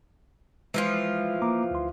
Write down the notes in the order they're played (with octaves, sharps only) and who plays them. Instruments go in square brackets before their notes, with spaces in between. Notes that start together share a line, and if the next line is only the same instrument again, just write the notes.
[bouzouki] E3 F3 F4 [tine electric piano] G#3
[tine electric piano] A#3 A#5 D6
D2 C6